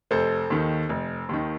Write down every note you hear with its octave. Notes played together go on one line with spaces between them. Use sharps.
F1 A4 C5
D#2 D#3
F1
D#2 D#3